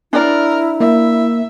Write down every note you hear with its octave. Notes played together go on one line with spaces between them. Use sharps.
D4 E4 A#4 D5
A#3 E5